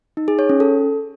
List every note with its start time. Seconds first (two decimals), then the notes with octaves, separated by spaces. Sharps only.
0.17 D#4
0.28 G#4
0.39 C#5
0.49 C#4
0.60 A4